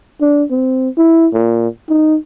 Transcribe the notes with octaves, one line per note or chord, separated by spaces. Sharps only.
D4
C4
E4
A#2
D#4